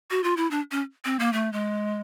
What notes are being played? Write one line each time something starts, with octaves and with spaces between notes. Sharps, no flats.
F#4
F4
E4
D4
C#4
C4
A#3
A3
G#3